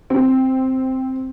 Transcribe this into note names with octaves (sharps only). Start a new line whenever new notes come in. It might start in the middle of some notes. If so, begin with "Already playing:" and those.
C4